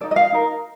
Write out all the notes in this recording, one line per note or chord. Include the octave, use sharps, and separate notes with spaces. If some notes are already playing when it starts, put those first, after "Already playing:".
D#4 A4 D5
D#5
F5
D#4 A#4